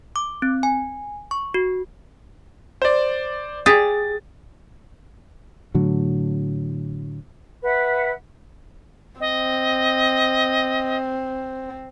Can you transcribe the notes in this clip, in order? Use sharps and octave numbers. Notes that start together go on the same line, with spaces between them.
D6
C4
G#5
C#6
F#4
C5 D5
G4 G#4 A6
A2 D3 F#3
B4 E5 F#5
C4 D#5